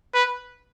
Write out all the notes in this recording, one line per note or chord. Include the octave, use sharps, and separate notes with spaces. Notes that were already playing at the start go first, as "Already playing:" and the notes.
B4